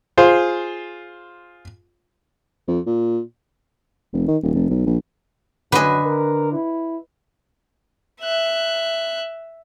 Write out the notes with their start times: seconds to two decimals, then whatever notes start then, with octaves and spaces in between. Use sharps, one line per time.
0.18 F4 G#4 C5
2.68 F2
2.86 A#2
4.13 F1
4.28 D#3
4.43 D#1
4.54 F1
4.69 B1
4.86 A#1
5.72 F#2 D3 B4 D#5 G#5
6.05 A#4
6.53 E4
8.21 E5 F#6